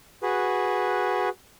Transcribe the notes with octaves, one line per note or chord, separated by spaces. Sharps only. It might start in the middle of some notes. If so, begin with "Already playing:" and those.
F#4 G#4 B4